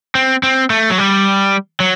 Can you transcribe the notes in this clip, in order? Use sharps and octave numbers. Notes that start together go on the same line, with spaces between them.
C4
C4
A3
F#3
G3
F#3